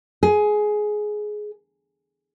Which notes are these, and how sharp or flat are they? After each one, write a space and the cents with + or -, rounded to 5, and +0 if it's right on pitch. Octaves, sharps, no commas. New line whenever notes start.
G#4 +15